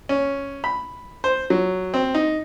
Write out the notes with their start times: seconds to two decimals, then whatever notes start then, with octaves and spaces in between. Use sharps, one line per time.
0.09 C#4
0.64 B5
1.24 C5
1.50 F#3
1.94 C4
2.15 D#4